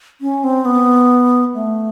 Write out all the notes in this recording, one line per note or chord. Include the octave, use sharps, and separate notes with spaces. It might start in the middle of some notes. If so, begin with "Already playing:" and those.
C#4
C4
B3
A3